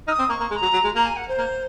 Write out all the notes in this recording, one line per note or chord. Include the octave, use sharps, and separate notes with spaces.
D#4 F6
D#6
C4
A#3 C#6
A#3
G#3 C6
A#5
F#3
F#3
G#3
A#3 A#5
G#5
F#5
C5
A#3